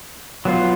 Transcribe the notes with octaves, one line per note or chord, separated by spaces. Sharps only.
F#3 B3 F4